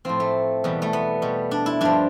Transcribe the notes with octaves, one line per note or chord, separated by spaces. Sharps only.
A2 F3 C4
A3
E2 B2 G3
A3
B3
B2 G3
D4
E4
G2 F3 D4